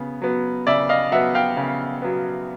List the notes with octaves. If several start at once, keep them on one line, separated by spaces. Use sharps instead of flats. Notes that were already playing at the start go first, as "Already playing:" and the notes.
Already playing: C#3 B3
F#3 B3
C#3 D5 E5
D#5 F5
F#3 B3 E5 F#5
F5 G5
C#3
F#3 B3